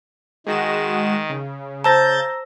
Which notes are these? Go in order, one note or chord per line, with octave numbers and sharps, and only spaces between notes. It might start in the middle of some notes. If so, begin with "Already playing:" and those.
D#3 G#3 F#4 E7
C#3
C5 A5 A#5 E6 G6 A6 A#6